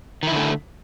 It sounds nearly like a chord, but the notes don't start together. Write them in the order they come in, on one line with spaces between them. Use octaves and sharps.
D#3 E4 D3 A3